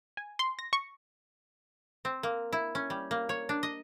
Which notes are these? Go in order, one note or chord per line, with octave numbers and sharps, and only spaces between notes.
G#5
C6
A#6
C#6
C4
A#3
E4
C#4
G3
A#3
C#5
D4
D#5